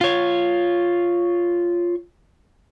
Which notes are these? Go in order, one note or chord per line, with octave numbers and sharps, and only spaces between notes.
F4 C#5